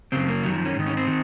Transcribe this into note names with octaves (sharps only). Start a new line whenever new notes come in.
F#2 C#3 C4
A#3
F#2 D#3 F#3
F3
C#4
G#2 D#3
C#4
C4
D#3